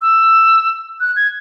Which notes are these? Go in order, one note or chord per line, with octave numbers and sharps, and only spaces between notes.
E6
F#6
G#6